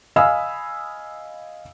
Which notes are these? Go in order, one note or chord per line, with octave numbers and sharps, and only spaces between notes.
D#5 F5 G#5 B5 D#6 E6